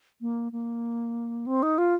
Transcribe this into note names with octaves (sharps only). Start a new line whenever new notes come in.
A#3
A#3
C4
D#4
F4